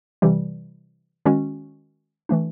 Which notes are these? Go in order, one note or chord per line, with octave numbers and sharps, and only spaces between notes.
C3 E3 G3
D#3 G#3 C#4 F#4
E3 A3 D4